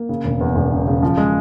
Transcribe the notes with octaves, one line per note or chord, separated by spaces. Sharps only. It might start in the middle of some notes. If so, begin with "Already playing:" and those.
Already playing: A#3
C#3
E1
E2
E1
C#3
C#3
F3
G#3